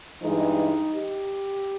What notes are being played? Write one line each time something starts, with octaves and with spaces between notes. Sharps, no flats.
G2 E3 G#3 D#4
G4